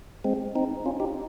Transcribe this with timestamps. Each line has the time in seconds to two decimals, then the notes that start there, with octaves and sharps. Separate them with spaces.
0.24 G#3 C4
0.55 C4 D#4
0.86 C#4 F4
1.00 D#4 G4